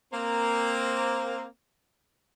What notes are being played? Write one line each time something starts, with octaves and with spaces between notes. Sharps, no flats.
A#3 C4